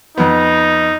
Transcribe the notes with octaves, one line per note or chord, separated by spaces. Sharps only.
F2 B3 D#4